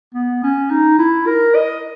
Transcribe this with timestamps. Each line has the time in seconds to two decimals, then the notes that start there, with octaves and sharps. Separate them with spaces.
0.15 B3
0.44 C#4
0.71 D#4
0.99 E4
1.27 A#4
1.55 D#5